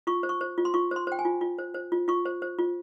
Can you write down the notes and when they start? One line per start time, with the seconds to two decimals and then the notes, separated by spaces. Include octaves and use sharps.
0.07 F4 C#6
0.23 C5
0.29 C#6
0.41 C5
0.58 F4
0.65 C6
0.74 F4 C#6
0.91 C5 C6
1.07 C5 G5
1.19 G#5
1.25 F4
1.41 F4
1.58 C5
1.74 C5
1.92 F4
2.08 F4 C#6
2.26 C5
2.42 C5
2.59 F4